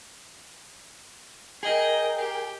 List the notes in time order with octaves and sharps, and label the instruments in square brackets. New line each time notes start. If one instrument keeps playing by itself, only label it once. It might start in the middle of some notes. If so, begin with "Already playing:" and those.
[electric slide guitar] G#4 [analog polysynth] A#4 G5 [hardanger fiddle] D#5
[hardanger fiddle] G4